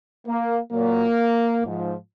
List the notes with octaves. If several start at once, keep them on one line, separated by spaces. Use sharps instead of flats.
A#3
A#2 F#3 A#3
G#2 F3